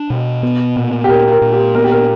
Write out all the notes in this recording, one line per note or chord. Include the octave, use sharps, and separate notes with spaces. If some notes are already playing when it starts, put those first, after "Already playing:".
Already playing: D4
B2
B3
A#2
G4
A#2 A#4
A#4
A#2
G4
B3 A#4
G4
A#4